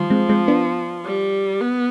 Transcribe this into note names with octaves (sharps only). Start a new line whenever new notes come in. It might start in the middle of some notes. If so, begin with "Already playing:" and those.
Already playing: D#3 F3 G3
G#3 C4
G#3 C4
B3 D4
G3
B3